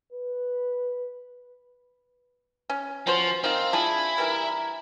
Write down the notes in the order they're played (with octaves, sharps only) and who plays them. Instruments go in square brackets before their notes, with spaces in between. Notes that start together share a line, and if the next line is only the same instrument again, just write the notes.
[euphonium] B4
[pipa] C#4
[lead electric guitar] F3 [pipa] C#4 F#4 C5
[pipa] D#3 F5 [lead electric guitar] C4
[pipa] D4 F4 G#4 [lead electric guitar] E4
[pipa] E3 G3 A#4